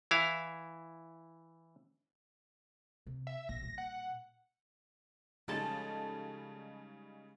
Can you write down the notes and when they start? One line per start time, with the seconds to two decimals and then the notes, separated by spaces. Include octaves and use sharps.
0.11 E3 E4 F5
3.07 C3
3.27 E5
3.49 A#1 G#2 A#6
3.63 A#2 G3
3.78 F#5
5.48 C#3 F3 G3 G#3 D#4 G#4 A4 A5